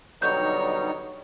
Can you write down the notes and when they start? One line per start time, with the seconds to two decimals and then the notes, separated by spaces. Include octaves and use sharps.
0.22 B2 D3 F#3 G3 D#4 C#5 G6